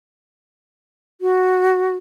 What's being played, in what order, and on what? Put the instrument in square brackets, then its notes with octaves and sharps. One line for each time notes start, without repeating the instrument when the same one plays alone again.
[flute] F#4